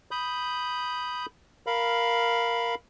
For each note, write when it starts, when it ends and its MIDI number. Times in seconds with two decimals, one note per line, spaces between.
0.11 1.26 83
0.11 1.26 87
0.11 1.26 91
1.67 2.75 70
1.67 2.75 77
1.67 2.75 83